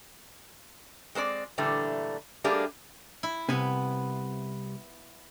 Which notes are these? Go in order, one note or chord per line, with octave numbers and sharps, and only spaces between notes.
G#3 C4 C5 D5
A#2 D3 E3 G3 A3
G3 A3 A#3 D4 G4 G#4
E4
C2 C3 B3 G#5